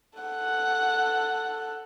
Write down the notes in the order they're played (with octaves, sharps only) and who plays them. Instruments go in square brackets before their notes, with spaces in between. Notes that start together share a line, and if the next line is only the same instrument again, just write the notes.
[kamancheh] A4 F#5